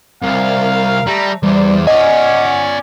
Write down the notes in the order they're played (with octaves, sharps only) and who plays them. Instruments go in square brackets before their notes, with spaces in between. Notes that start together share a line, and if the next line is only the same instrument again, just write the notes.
[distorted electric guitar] C2 [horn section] A#4 F5
[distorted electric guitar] G3 [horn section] A3 A#5
[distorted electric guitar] E2 [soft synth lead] G3 [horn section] C5 D5
[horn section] C#4 [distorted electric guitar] D5 G#5 [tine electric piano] D#5 [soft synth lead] F#5